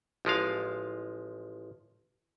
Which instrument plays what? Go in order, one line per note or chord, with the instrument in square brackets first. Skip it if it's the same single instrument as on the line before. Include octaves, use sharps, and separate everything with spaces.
[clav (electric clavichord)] A1 F3 G#3 F5